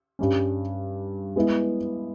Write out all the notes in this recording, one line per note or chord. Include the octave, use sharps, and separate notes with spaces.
G2 G3 C#4
G#3 B3 E4